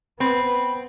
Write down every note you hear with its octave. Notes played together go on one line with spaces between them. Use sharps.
B3 C4 B5